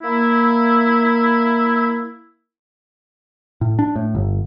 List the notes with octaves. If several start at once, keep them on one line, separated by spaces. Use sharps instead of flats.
A#3 E4
A2
D4
A2
G1